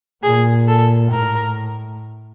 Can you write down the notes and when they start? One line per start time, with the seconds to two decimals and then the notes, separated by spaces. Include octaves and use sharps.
0.23 A#2 G#4
0.68 A4
1.12 A2 A#4